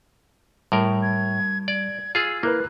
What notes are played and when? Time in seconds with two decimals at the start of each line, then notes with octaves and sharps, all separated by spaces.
0.72 A2 G3 A#4
1.02 G#6
1.68 D5 G#6
2.15 F4 G#4 E6
2.43 A#3 E4 A#4 B4 F#6